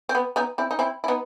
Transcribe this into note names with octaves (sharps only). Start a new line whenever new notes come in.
C4
B3
B3 D#4
C4 E4
D#4
C4 E4
E4
B3 D#4